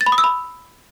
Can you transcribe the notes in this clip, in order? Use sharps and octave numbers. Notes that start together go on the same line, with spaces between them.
A6
B5
D#6
E6
B5